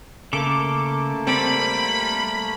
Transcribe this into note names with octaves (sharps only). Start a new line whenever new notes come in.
C#3 A3 A#3 A4 D6
G3 C4 A4 D5 B5